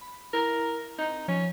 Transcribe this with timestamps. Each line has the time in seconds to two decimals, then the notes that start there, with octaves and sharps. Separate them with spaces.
0.01 B5
0.33 E4 A#4
0.98 C4 D#4
1.28 F3 C#4